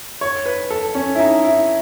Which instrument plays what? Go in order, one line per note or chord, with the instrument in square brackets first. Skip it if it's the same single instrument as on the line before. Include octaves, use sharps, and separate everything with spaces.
[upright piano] C#5
B4
A4
C#4
E4
D#4
E4